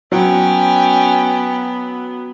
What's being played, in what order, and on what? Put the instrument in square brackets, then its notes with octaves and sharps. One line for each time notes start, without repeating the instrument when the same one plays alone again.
[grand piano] F#3 [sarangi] B3 [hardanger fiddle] C#4 G5